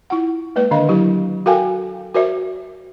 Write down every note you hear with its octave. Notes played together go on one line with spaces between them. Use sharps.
E4 F4 F#5
G#3 A#3 B4 D5
D3 D#3 D4 D#5 F5
F#3 E4 G4
F#4 A4 A#4 F5 G5 G#5
F#4 A#4 C5 D5 E5